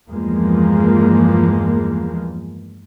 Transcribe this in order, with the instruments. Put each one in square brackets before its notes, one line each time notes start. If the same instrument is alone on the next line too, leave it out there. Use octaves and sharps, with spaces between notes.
[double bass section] E2 G2 F3 G#3 A#3